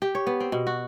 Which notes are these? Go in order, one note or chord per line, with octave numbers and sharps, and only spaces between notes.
G4
C#5
B3
C4
B2
F#4